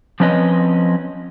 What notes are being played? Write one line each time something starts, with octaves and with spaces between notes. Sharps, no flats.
F3 C4 C#4 B4 D#5